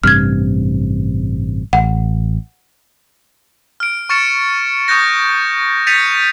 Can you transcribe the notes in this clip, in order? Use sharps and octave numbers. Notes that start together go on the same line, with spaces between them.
A1 G2 C3 F6 G#6
A1 F#5
F6 D7
C#6 F6 A6 C#7 E7
C#6 D#6 F#6 G6 A#6
G6 A6 B6 C#7 D#7 F7